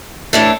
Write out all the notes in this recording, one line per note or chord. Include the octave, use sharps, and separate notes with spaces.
A2 E3 A3 D4